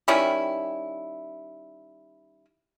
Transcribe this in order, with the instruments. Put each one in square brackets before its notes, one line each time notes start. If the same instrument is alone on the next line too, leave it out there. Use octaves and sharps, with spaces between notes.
[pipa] D#3 G3 C#4 E4